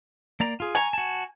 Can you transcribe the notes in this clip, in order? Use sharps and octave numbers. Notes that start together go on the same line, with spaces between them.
A#3 D5 A#5
F4 G#4
G#5 A#5 C#6
F#4 A5